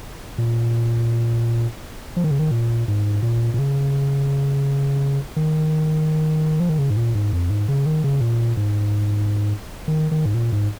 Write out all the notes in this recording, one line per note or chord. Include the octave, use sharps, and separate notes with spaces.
A#2
F3
D#3
C#3
D#3
A#2
G#2
A#2
A#2
C#3
D#3
F3
D#3
C#3
G#2
A#2
G#2
F2
G#2
C#3
D#3
C#3
A#2
G#2
D#3
D#3
G#2
A#2
G#2